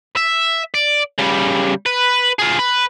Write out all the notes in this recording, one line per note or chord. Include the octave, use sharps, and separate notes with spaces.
E5
D5
C#3 G3
B4
F4 G#4
B4